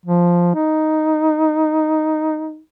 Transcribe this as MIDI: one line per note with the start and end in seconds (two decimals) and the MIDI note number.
0.05 0.53 53
0.54 2.60 63